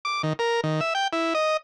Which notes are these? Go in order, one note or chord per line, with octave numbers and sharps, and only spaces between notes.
D6
D#3
A#4
D#3
E5
G5
E4
D#5